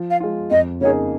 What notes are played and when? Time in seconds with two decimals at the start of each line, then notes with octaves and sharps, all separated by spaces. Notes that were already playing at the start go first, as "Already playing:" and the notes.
Already playing: F3
0.11 F5
0.20 G#3 F4
0.51 F2 D#5
0.81 C#3 A#3 D#4 G#4 C#5